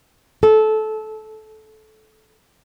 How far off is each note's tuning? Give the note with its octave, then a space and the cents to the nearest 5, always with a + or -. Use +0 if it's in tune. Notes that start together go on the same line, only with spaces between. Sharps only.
A4 -20